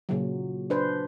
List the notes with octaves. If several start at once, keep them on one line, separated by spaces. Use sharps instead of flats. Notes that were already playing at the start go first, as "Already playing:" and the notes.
A#2 C#3 F#3
D4 B4 C5